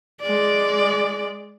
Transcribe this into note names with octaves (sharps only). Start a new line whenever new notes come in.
G#3 D5